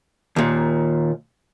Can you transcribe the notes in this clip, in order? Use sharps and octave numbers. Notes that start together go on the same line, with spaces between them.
D#2 A#2